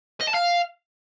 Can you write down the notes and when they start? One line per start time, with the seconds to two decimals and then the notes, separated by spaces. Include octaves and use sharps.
0.21 D#5
0.27 A5
0.34 F5